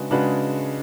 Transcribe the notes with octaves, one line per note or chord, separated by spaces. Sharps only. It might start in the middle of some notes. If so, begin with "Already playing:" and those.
Already playing: C#3 G#3 D4 F#4 B4
C#3 G#3 D4 F#4 B4